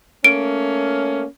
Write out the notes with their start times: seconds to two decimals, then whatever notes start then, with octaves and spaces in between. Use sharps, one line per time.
0.24 A3 A#3 C#4 D7